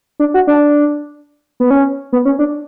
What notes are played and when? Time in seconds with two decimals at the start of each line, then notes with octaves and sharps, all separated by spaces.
0.20 D4
0.34 F#4
0.47 D4
1.60 B3
1.71 C#4
2.13 B3
2.25 C#4
2.39 D4